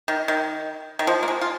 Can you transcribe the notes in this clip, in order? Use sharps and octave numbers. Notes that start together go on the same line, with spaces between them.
D#3
D#3
D#3
F3
A#3
G#3
F4